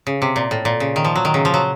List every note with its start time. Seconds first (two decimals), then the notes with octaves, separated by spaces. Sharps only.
0.07 C#3
0.22 C3
0.36 A#2
0.51 A2
0.65 A#2
0.80 C#3
0.96 D#3
1.04 F3
1.15 F#3
1.25 D#3
1.34 C#3
1.45 F3
1.54 F#3